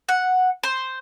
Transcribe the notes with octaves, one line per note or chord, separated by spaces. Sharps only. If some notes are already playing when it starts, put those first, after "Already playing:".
F#5
C5